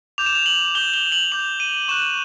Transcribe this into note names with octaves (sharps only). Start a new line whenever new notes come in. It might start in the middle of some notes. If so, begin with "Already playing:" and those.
D6 G6 F7
E7
F7
F#7
D6 G6 G7
G7
F#7
D6 G6 F7
D#7
C#6 F#6 E7